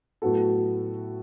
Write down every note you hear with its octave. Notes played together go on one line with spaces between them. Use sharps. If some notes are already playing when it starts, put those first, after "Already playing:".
A2 F#3 B3 F#4 A4